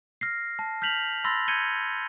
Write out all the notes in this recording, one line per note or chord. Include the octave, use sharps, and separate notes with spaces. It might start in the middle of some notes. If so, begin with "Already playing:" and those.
F6 A#6 C7
A5
F6 G6 B6 F7 F#7
B5 C6 E6 A6 A#6
G6 G#6 C#7 D#7 G7